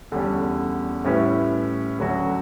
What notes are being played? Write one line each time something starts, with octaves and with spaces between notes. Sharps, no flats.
E2 D3 G3 C#4
A2 G3 C#4 E4 B4
D2 D3 F#3 C#4 F#4